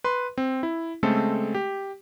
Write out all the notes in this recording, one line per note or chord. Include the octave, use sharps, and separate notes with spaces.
B4 C6
C4
E4
C#3 G#3 A3 C4 A4
G4